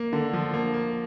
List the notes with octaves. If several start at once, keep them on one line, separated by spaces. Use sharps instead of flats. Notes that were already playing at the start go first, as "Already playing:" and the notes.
Already playing: A#3
D3
F3
A#3
A#3